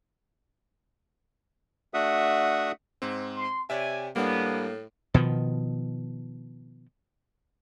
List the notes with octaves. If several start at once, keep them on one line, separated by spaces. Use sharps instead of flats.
A3 D4 F#4 E5 F#5 D#6
G#2 C4
C6
C3 C#5 D5 E5 G#5
A2 G3 A#3 B3 D4
B2 D#3 F3